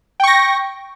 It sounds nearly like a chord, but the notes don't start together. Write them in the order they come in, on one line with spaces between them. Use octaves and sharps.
G5 C#6 A#6